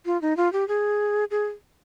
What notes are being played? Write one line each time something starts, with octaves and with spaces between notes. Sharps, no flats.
F4
D#4
F4
G4
G#4
G#4